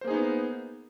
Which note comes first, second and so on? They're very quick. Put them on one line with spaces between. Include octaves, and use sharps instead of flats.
C5 A#3 G#4 D#4 B3